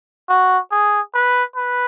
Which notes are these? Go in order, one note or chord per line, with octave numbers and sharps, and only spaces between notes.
F#4
G#4
B4
B4